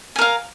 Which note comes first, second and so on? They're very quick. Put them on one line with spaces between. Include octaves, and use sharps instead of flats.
G#5 A#4 F5